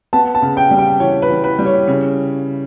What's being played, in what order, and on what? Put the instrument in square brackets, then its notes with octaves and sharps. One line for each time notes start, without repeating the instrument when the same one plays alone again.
[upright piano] B3 A5
A5
C#3
G5
G3
G5
E3 C#5
B4
E3
B4
G3
C#5
C#3 C#5